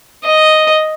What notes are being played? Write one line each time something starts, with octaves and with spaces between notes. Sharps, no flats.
D#5